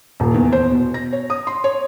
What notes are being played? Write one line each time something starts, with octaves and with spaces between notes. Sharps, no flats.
D#1
E2
C5
B2
A#6
C#5
D#6
C6
C#5